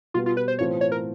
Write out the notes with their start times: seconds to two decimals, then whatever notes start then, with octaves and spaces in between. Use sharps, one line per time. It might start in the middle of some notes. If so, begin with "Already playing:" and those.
0.14 B2 G3 B3 F4
0.26 F4
0.37 B4
0.48 C5
0.59 A2 E3 A3 C4 F4 C#5
0.81 C#5
0.92 A#4